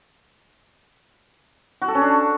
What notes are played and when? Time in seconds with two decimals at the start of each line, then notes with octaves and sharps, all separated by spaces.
1.82 F#4
1.88 A4
1.95 C#4
2.02 D4